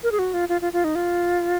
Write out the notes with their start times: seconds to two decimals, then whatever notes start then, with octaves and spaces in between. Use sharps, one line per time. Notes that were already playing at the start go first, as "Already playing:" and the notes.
0.03 A#4
0.12 G#4
0.19 F#4
0.34 F4
0.49 F4
0.61 F4
0.73 F4
0.84 D#4
0.95 F4